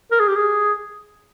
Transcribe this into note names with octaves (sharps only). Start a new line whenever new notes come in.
A#4
G#4
G4
G#4